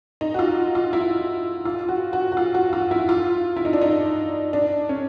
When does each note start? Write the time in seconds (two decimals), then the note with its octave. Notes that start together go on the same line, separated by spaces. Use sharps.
0.21 D#4
0.34 F#4
0.39 F4
0.75 F4
0.93 E4
1.65 F4
1.89 F#4
2.13 F#4
2.32 F#4
2.37 F4
2.54 F#4
2.73 F4
2.91 E4
3.09 F4
3.56 E4
3.65 D#4
3.73 D4
3.81 D#4
4.53 D4
4.89 C#4